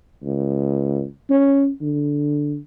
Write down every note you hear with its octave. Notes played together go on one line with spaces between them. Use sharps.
C#2
C#4
D3